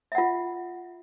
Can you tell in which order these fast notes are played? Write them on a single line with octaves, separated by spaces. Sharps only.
E5 F#5 F4